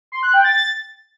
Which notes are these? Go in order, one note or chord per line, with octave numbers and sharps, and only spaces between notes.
C6
F#6
G5
A6